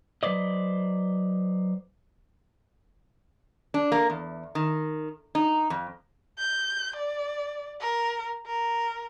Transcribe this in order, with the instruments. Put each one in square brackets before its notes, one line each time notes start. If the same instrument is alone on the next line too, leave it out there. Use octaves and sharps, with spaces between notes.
[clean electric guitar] F#3 B4 C5 D5 D#5
[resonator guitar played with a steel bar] D4
A#3
E2
D#3
D#4
F2
[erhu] G6
D5
A#4
A#4